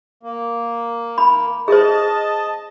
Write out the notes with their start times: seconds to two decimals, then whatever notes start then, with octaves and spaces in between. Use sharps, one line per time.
0.23 A#3
1.18 B5
1.68 G#4 C5 D#5 A5